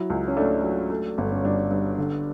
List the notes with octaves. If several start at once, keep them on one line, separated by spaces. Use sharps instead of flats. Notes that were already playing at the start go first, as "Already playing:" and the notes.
Already playing: F#3 E4
C#2
C#4
A3 D4
F#3
A3
G1
C#4
G2 D4
G2
D3